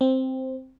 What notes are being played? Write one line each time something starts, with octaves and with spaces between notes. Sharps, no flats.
C4